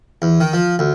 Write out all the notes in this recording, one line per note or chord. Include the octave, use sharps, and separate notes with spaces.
E2
D#3
F3
D2